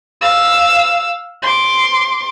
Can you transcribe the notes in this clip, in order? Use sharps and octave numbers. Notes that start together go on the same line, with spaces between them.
F5 E6
C6 D6